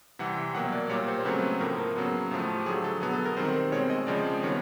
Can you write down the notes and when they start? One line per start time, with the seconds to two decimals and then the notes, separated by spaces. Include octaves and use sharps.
0.19 C3 E3 G3 C4 F#5
0.37 G5
0.55 B2 F#3 A#3 F#5
0.72 D5
0.90 A#2 G3 A#3 C#5
1.08 C5
1.25 C#3 F#3 A3 C4 B4
1.61 A2 F3 A#3 A#4
1.96 C#3 F#3 B3
2.31 A2 F3 A3
2.56 G4
2.66 D3 F#3 A3 G#4
2.84 A4
3.01 B2 F#3 B3 G#4
3.13 A4
3.25 A#4
3.37 D#3 G3 C4 C5
3.72 B2 G#3 C4 C#5
3.90 D#5
4.07 C#3 F3 G#3 C4 D5
4.43 D#3 G3 B3 C#5